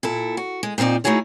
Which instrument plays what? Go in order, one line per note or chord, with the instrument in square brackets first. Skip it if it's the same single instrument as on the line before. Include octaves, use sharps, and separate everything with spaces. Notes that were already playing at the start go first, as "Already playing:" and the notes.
[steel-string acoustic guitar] A#2 E4 A4
F#4
G#3
A#2 F3 C4 D#4 D5
A3 D#4 E4 F#4 G#4 C#5